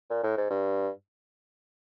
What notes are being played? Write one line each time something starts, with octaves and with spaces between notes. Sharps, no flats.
A#2
A2
G#2
G2